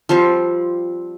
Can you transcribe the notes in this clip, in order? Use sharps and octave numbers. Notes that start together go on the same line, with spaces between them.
F3 G3 C4 C5